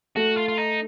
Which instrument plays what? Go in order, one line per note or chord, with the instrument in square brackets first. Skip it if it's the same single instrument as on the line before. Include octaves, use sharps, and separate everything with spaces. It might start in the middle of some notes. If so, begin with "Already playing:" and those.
[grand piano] A3 [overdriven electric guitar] F#4
[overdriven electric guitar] F4
F4
D#4